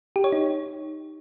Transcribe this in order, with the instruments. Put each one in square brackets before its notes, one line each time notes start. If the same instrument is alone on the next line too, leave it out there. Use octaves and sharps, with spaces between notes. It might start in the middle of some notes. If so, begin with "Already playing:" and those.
[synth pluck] G4
C#5
D#4